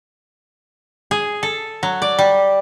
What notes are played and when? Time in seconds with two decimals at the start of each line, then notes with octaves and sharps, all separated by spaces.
1.11 G#4
1.43 A4
1.83 F#3
2.02 D5
2.19 G3